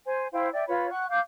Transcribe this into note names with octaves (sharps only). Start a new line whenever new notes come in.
C5 G#5
E4 C5 F5 G5
D5 E5 G5
F4 B4 C#5 B5
F#5 C#6 F#6
F5 D6 G6